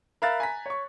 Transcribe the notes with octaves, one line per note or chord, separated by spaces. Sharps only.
A#4 E5 F5 B5 F#6 A6
G#5 A#5 B6
C#5 C#6